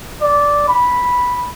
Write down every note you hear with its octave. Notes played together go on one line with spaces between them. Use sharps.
D5
B5